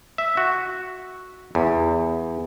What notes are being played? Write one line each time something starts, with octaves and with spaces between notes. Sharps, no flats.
E5
F#4
E2